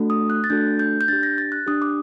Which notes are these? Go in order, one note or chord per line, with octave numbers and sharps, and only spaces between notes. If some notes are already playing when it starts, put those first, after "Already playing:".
Already playing: A3 D4 F#4 A4
D#6
F#6
A6
A3 D4 F#4 A4 G6
G6
G6
D4 G4 A6
A#6
A6
F#6
D4 G4 D#6
D6